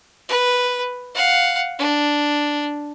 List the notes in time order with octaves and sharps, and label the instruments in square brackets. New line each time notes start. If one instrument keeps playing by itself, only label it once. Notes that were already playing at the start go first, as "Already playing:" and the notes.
[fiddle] B4
F5 F#5
D4